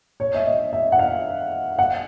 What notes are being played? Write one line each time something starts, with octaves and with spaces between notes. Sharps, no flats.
C#5
E5
D#5
E5
F#5
F5
F#5